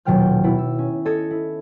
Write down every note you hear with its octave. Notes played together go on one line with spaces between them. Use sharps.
D#1 B2 F#3 G5 F6 G6
B2 E4
E6
C#4
A4 D#5 D#6 G#6 C#7
E4